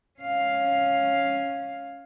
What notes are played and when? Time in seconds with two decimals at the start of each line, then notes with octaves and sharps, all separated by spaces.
0.20 C#4 F5